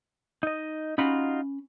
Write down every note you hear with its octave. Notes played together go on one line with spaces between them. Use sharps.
D#4 D#5
C#4 D#4 F4 F#4 B5